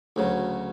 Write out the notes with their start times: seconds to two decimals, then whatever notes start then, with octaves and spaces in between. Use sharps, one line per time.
0.16 D2 C#3 F#3